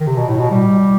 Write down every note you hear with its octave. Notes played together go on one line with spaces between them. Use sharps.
D#3
C3
B2
A2
B2
G3